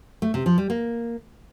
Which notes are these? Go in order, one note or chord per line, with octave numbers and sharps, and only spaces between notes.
A3
C3
F3
G3
A#3